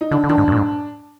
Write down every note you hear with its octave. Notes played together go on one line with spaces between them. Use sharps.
D#4
D3 D4
D3
D#3 D4
G#2
F#2
A#2
G#2